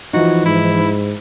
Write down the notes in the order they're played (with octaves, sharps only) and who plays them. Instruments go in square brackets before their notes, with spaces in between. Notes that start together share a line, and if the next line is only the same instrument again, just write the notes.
[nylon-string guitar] E3 F3 D#4 [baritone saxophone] F#4
[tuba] G#2 [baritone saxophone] E4